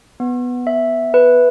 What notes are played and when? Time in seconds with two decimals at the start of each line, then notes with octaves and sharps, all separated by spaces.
0.20 B3
0.67 E5
1.14 B4